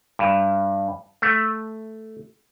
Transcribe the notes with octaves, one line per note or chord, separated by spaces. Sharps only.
G2
A3